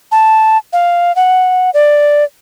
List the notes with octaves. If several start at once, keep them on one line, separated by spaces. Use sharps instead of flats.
A5
F5
F#5
D5